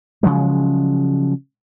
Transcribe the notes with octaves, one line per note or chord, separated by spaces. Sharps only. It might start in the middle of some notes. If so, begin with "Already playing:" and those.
C#3 F3 F#3 G#3